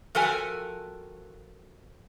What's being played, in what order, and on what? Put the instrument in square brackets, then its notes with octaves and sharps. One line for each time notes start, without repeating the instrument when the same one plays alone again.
[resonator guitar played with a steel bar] F3 F#4 A4 A#4 G5 G#5